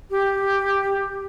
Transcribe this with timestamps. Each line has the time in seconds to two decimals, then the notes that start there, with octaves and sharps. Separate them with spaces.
0.10 G4